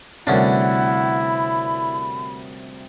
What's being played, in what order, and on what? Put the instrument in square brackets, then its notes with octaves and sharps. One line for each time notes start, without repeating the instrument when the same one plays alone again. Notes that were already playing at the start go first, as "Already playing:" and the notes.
[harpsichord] D2 C#4 D4 [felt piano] C3 G3 A#4 [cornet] E4 [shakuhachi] F#5
[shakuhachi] B5